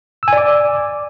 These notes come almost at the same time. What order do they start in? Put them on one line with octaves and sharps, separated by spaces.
E6 G#5 D5 D6